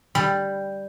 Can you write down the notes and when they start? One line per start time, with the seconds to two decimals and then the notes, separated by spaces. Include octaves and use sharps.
0.15 G3